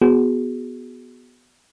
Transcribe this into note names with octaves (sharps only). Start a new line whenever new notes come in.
B3 F#4 G#4